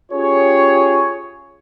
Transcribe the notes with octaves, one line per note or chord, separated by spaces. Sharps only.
C#4 F4 G4 G#4 C#5